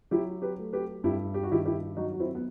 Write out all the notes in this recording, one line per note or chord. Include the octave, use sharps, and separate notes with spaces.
F#3 E4 G4
G4 B4
A3
G4 B4
G2 E4 G4
G4
F#4
D#3 E4 G4
E4 G4
F#3 D#4 F#4
F#4
C4 E4
B3